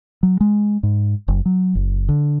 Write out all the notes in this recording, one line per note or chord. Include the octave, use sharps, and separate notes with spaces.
F#3
G#3
G#2
F#1
F#3
F#1
D3